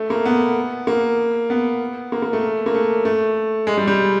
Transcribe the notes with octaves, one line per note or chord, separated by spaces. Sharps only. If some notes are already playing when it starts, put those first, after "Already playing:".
Already playing: A3
A#3
B3
A#3
B3
A#3
A#3
A3
A#3
A3
A3
G#3
G3
G3